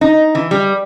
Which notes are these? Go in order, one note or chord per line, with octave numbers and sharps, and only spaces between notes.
D#4
E3
G3